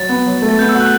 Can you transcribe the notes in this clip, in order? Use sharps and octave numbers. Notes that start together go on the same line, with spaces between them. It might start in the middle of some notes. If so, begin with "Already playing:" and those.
Already playing: F#3 A6
B3
F#3
A3
A6
B3 G6
E6
F#4
F#6